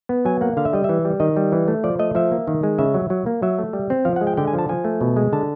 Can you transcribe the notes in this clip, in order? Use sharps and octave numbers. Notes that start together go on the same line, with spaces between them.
B3
F#3 G#5
A#3 F#5
D3 F5
E5
G3 D#5
E5
E3
G3
D#3 D#5
G3
E3
A3
F3 D5
A3 D#5
F3 E5
A#3
D#3
G#3
C#3 E5
F#3
F#3
A#3
F#3 E5
A3
G3
C4
F3 F5
F#5
G#3
G5
D3 G5
G#5
F3
A5
F3 G#5
A3
B2
G#3
D3 A5